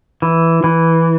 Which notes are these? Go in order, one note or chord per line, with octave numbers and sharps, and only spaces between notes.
E3
E3